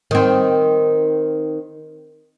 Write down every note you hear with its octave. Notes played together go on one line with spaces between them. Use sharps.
D#3 C4